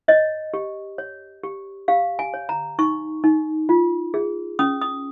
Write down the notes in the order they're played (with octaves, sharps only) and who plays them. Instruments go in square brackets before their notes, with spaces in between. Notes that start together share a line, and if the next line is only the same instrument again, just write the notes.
[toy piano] C#5 D#5
G4
C#5
G4
G4 F5
G#5
C#5
A#5
D#4 C#6
D#4
F4
G#4
C#4 D#6
D#6